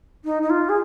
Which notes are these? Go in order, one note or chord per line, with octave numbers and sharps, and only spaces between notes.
D#4
D#4
F4
G#4